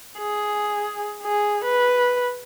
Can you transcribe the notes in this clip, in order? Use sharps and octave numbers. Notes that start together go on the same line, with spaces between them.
G#4
G#4
B4